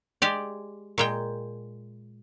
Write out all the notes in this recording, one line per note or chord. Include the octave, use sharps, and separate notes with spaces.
G#3 G4 D5
A#2 G#3 G5